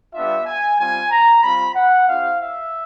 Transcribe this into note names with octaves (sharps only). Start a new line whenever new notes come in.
G3 B3 D4 F4 E5
G#5
G3 C4 F4 G#5
A#5
G3 C4 F4 B5
F#5
C4 E4 G4 F5
E5